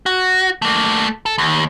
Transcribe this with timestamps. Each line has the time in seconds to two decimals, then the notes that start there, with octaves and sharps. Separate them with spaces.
0.06 F#4
0.62 A3 A#3
1.26 A4
1.38 D#2